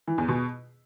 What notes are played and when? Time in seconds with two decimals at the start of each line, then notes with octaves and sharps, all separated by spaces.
0.08 E3
0.18 E2
0.28 B2